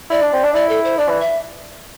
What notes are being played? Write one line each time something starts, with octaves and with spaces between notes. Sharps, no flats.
E4 D5
D4
C4
D4
E4 D5
A4
C5
D4 D5
E3
E5